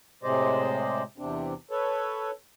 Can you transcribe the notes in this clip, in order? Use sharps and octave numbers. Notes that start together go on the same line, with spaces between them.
A2 C3 G#3 C5 D5 D#5
E2 C3 C4 D4
A4 B4 C#5